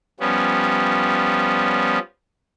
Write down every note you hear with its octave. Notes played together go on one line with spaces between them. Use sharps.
F3 G3 B3 C#4